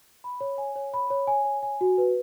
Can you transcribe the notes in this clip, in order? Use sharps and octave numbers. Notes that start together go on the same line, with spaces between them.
B5
C#5
G#5
C#5
B5
C#5
G#5
C#5
G#5
F#4
B4